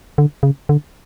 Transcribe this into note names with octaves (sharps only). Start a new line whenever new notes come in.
D3
C#3
D3